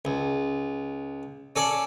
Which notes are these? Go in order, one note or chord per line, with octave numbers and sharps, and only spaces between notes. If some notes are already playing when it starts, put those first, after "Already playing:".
C#2
C#4 A4 D5